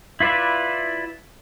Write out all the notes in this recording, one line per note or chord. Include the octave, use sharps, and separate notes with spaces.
E4 F4 B4 D5 E5